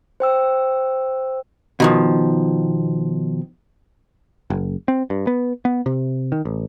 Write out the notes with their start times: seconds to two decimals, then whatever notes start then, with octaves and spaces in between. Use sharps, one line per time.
0.20 C5 G5 E6
1.80 B2 D#3 F3
4.50 F#1
4.88 C4
5.10 G2
5.27 B3
5.65 B3
5.86 C3
6.32 D#3
6.45 A1